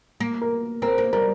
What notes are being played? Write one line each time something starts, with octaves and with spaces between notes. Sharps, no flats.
A#3
A#4
C4 A#4
A#3
G3 A#4